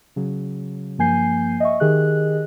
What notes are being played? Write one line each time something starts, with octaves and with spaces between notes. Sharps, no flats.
C#3 F#3
G2 F3 A#3 G#5 G6 C7
D#5 E5 C#6
D#3 G4 G#4 D#5 F#6